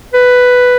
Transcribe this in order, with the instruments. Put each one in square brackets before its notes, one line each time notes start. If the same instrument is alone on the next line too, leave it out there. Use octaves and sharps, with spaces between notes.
[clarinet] B4